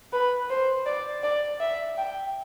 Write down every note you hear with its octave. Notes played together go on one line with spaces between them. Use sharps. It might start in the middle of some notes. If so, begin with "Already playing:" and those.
B4
C5
D5
D5
E5
G5